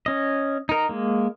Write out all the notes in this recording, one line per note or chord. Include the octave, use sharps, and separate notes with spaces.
C#4 D#5
D#4 A#4
G#3 A#3